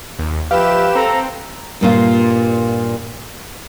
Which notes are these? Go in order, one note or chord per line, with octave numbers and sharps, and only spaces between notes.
D#2
F3 G4 B4 E5 F5 E7
C4 A4 A#5
G2 A#2 F4